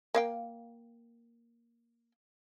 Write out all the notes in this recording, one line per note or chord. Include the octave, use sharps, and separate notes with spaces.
A#3 F5 G5